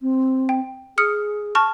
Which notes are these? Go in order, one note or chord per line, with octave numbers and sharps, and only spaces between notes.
C4
G5
G#4 D#6 F6 C#7
A5 C#6 F6